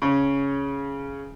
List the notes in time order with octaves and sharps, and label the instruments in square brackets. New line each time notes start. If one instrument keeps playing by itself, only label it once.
[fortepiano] C#3 C#4